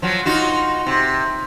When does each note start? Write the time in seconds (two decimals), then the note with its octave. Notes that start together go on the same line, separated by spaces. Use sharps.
0.02 F3 F#3
0.26 D#4 F4 F#4
0.87 C3